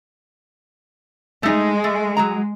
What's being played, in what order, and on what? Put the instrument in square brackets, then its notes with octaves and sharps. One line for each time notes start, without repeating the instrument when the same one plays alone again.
[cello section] G#3 [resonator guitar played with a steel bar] A3 D#4
[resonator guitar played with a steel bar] A3
F#3 G#4 A#5